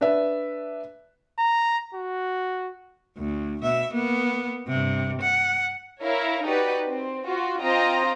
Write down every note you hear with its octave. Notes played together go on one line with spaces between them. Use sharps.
D4 B4 D5 E5
A#5
F#4
D2
B2 E5
A#3 B3
G2 C3
F#5
E4 A#4 C#5 F5
D#4 F#4 G4 B4 D5
C4
F4 F#4
C4 F4 D#5 G5 A#5